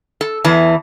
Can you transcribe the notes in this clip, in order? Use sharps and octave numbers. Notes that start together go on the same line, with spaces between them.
A4
E2 E3 A5